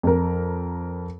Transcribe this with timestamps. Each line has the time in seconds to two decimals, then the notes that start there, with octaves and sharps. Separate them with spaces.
0.03 F2 A#4